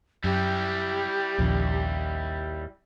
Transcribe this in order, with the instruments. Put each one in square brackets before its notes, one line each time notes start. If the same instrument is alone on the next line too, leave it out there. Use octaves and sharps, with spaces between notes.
[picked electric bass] F#2 [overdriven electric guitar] G3 E4 [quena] G4
[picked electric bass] A#1 C#3 F3 [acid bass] D#2